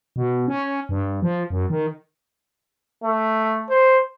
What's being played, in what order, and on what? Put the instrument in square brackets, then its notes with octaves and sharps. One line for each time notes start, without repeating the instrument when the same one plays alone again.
[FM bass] B2
C#4
G2
F3
F#2
D#3
[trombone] A3
C5